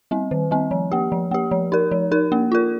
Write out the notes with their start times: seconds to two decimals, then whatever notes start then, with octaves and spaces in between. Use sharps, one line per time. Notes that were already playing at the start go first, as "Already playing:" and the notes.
0.11 G3 C4
0.31 D#3
0.51 G3 C4
0.71 F3
0.92 A#3 G4
1.12 F3
1.31 A#3 G4
1.51 F3
1.72 D#4 A#4
1.91 F3
2.12 D#4 A#4
2.32 A#3
2.52 F4 A#4